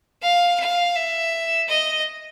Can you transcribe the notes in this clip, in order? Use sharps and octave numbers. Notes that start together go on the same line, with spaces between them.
F5
F5
E5
D#5